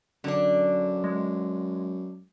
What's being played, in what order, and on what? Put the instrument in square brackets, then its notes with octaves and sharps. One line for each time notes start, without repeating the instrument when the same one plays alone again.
[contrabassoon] F#2 [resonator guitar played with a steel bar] D3 D4
[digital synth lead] G#3